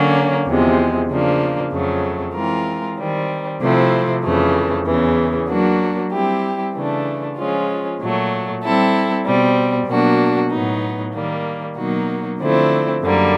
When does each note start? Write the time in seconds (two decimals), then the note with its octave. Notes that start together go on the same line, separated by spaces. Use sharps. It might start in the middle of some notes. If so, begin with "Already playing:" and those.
Already playing: D3 F#3 A#3 C#4
0.46 E2 C3 F3 G#3
1.08 C#3 F3 A#3 D4
1.72 F2 C#3 F#3 A3
2.34 E3 G#3 C4 F4 A#4
2.97 D#3 G3 C4
3.61 C3 F3 A3 C4 E4
4.23 F2 C#3 E3 A3
4.85 E2 C#3 E3
5.48 F#3 A#3 D4 F#4
6.11 G3 C4 E4 G4
6.74 C#3 E3 A3 D4
7.36 F3 G#3 C#4 F4
7.99 A#2 F#3 A3
8.63 G3 C4 E4 A4
9.25 B2 G3 C4
9.87 B2 F#3 A#3 D4 F#4
10.50 A2 F#3 B3 D#4
11.13 D#3 G3 A#3
11.75 B2 F#3 A#3 D#4 F#4
12.39 D3 F3 A3 C4 E4
13.02 F#2 D3 G3 A#3